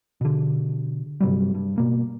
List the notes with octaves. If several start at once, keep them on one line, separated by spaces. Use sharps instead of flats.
B2 D3
G2 C3 F#3 G3
G2
B2 A#3